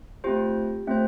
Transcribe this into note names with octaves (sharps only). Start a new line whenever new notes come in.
A3 C4 F4 G4 C5
A3 C4 F4 C5